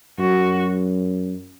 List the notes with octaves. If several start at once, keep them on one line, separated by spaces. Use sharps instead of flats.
F#2 F#4